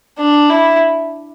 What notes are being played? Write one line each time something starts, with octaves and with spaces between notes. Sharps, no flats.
D4
E4